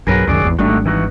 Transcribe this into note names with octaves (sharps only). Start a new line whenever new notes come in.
B1 G2 F#3 G#4 A#4 B4
C#2 F#2 D#3 F#3 G#4 D5
G#1 E2
G#1 G3 A3 D4 D#4 F#4
E3 D#4 F#4